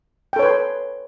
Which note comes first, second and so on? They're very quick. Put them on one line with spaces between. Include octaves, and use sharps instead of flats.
G5 A4 C#5 B4 C6